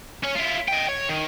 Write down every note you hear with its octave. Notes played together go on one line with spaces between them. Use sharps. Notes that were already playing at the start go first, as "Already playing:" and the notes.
C#4 C#5
E4 F4
D#5 G5
C#5
D#3